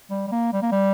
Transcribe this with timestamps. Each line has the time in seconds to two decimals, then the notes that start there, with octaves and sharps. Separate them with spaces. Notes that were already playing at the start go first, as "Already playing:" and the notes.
0.10 G3
0.27 G3
0.32 A#3
0.53 G3
0.62 A#3
0.71 G3